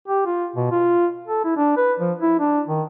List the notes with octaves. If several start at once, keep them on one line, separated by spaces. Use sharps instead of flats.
G4
F4
B2
F4
A4
E4
D4
B4
F3
E4
D4
D#3